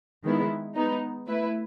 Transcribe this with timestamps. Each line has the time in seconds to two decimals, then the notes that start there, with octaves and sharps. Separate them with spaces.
0.24 D#3 G#3 B3 E4
0.76 G#3 B3 D#4
1.27 A3 E4 B4